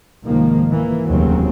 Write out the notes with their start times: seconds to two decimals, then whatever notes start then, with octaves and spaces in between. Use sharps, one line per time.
0.25 C2 G#2 D#3 F3 A#3
0.70 E3 A#3
1.05 F1 D#2 A#2 C#3 F#3 C4